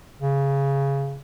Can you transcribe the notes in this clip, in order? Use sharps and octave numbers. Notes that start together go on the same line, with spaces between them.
C#3